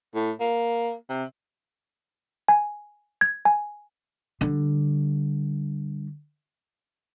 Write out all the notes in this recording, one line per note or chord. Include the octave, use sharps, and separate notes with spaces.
A2
A#3
C3
G#5
G#6
G#5
D3 G3